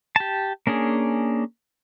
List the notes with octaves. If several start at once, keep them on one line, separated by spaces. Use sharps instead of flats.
G4 A5
A#3 C#4 D4 G#4